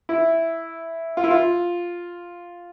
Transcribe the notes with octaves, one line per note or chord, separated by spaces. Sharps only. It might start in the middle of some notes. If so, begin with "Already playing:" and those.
E4
F4
E4
F4